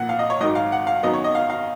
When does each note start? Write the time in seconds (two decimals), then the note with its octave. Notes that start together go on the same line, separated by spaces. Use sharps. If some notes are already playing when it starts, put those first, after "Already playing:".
Already playing: A#1 A#2 F#5
0.09 F5
0.19 D#5
0.30 C#5
0.41 G#1 G#2 D#3 F#3 D#5
0.55 F5
0.72 F#5
0.87 F5
1.03 F#2 D#3 F#3 B3 D#5
1.13 C#5
1.24 D#5
1.35 F5
1.50 F5